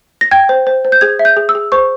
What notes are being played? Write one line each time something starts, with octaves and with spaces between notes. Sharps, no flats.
A#6
G5 G#6
C5
C5
C5
G6
G#4 G#6
E5
G6
G#4
E6
G#4
C5 C#6